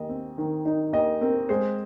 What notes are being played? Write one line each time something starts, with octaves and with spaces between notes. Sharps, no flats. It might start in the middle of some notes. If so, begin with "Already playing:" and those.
Already playing: D#2 D#5
C4
D#3
D#4
D#2 D#5
C4 A#4
G#3 C5